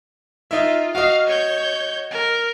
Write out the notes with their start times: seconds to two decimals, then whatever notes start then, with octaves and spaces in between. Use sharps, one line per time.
0.51 D#4 F4 E5
0.95 F#4 D#5 F5
1.28 C#5 G6
2.11 A#4